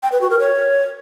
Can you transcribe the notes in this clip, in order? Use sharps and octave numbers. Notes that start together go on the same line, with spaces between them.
G5
B4
F#4
A#4
C#5